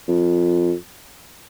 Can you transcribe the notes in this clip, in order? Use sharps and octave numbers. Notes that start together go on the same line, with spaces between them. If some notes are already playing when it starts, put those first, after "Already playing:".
F2